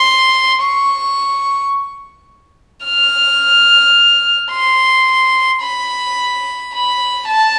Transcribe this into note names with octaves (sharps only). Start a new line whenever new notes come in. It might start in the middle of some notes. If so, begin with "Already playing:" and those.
Already playing: C6
C#6
F6
C6
B5
B5
A5